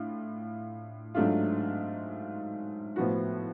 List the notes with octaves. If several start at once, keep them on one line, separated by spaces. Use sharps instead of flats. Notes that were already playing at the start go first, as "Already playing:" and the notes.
Already playing: A2 D4 F4
G#2 F#3 A3 D4 F4
A2 F3 B3 F#4